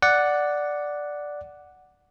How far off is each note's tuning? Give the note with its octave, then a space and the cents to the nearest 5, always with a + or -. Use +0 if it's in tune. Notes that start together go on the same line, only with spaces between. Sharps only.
D5 +0 F#5 +0